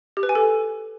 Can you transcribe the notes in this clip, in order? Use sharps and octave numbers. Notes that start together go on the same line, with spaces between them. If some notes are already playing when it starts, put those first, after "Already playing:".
G4
B4
G#5
A4